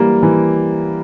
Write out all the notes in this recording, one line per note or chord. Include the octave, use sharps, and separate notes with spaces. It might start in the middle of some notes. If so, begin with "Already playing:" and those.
Already playing: E3 G3 A#3
E3